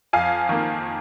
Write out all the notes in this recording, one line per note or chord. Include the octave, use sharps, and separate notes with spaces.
F2 F5 G#5
D#3 A#3